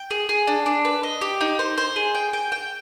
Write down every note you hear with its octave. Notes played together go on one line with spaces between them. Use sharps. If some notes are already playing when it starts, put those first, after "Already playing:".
Already playing: G5
G#4
G#4
D4
D4
B4
D#5
G4
D#4
C5
C5
G#4
G5
G5
G5